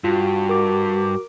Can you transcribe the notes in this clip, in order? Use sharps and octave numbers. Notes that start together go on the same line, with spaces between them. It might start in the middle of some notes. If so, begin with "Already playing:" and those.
G2 F4 F#4
A#4 D6